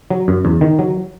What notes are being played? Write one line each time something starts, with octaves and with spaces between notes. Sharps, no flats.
F#3
F#2
E2
D#3
F#3